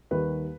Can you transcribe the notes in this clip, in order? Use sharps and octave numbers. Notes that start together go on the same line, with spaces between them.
D#2 D#3 G3 B4